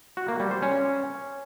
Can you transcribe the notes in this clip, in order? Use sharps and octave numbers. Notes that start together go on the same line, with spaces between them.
F#4
A#3
G3
C5
C#4